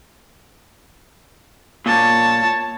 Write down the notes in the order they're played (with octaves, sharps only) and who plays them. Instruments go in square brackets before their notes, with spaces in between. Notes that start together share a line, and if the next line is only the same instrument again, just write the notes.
[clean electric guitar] A#2 [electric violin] C#5 A5